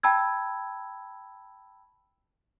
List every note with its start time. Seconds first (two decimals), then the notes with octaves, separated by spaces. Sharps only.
0.03 G5 A5 B5 E6 G#6